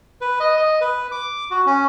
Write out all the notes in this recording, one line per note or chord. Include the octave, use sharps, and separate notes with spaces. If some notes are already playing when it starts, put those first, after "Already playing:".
B4
D#5
D#5
B4
D6
F#4
C#4